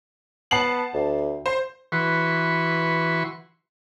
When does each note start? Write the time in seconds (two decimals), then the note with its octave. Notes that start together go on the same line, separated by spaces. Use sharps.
0.51 B3 A5 C7 F#7
0.94 D2
1.46 C5
1.92 E3 F#4 B4 C6 C#6